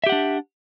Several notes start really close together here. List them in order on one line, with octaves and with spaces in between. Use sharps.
E5 G4 F#5 D4